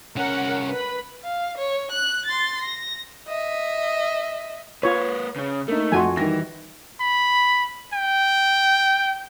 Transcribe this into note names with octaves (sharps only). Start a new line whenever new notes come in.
C2 C#4 A#4 F#5
B4 B5
F5
C#5
F#6
C6 A6
A#6
D#5 E5
A#3 F4 B4 C#5
C#3 C#4
A3 A#3 D#4
F2 F#4 F#5 G#5 C6
D#3 E3 G3 A#6
B5
G5